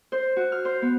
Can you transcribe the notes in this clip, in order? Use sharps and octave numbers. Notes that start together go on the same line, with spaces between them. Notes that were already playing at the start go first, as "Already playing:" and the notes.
C5
F#4
F6
C5
B3